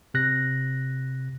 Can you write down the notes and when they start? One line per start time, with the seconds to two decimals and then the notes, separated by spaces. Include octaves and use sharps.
0.14 C3 F#6 A#6